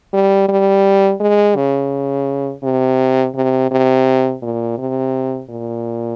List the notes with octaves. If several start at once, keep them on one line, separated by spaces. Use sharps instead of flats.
G3
G3
G#3
C#3
C3
C3
C3
A#2
C3
A#2